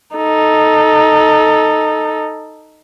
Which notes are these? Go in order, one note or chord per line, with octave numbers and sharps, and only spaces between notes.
D#4 A4